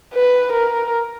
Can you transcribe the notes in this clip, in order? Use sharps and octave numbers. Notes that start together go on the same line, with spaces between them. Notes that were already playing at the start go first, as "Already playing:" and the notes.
B4
A#4